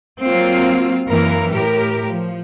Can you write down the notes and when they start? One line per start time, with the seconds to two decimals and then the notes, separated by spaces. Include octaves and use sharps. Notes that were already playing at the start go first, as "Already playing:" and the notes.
0.23 F#3 A#3 C4 F4
1.08 F#2 E3 A#3 A#4
1.51 A2 G4 A#4
2.05 F3